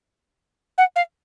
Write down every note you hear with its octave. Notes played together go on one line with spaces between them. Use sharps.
F#5
F5